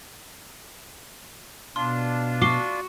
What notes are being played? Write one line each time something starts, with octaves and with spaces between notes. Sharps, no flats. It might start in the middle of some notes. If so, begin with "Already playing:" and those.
B2 D4 F4 C6
F#4 D6 C7 G7